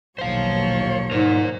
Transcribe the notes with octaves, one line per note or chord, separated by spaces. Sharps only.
A#1 D#2 B2 F#3 C5 C#5 F5
G#2 A#4 D5